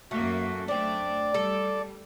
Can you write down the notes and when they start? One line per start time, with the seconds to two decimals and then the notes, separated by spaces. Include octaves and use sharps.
0.11 F#2 A3 A#3 F#4
0.68 A3 C4 D4 D5
1.34 G3 A4